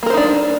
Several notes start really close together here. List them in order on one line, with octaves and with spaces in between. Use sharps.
A#3 A#4 C5 D#4 D4